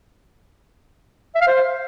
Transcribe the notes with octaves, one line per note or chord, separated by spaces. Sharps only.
E5
F5
C5